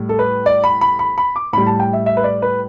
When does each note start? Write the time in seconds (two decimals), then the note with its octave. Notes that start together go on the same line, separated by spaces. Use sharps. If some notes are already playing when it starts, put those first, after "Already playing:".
Already playing: A2 G3
0.09 A4
0.19 B4
0.46 D5
0.64 B5
0.81 B5
0.99 B5
1.18 B5
1.36 D6
1.53 A2 G3 B5
1.67 A5
1.80 G5
1.93 E5
2.06 E5
2.17 B4
2.24 D5
2.42 B4